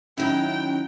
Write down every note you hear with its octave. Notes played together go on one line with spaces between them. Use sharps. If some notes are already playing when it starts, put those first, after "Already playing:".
D#3 F#3 C#4 E4 G5